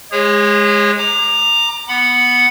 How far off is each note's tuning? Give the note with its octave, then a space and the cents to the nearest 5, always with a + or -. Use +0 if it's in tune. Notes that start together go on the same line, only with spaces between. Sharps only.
G#3 +0 G#4 -30 C#5 -30
A#5 +0 D6 +30
B3 +0 F#5 +0 B5 +15